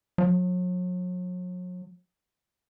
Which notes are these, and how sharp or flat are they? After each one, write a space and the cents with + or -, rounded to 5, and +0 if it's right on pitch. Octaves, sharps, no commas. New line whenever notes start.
F#3 -40